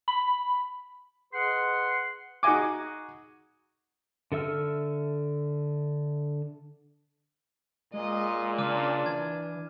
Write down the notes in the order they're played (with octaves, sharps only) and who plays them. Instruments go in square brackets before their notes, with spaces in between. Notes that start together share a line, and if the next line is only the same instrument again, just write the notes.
[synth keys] B5
[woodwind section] G#4 B4 D#5 F#5 C6
[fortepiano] D#4 F#4 G#4 D#5 G#5 D6
[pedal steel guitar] D3 A4 E5 E6 F6
[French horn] A#2 [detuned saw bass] G#3 [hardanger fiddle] D#5
[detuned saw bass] C#3 [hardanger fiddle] D4 [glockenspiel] D6 F6 D#7
[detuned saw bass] E3 [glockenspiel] G#6